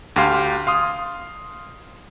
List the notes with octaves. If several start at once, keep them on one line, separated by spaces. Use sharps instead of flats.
D2 G4 F5 C6
F5 C6 D#6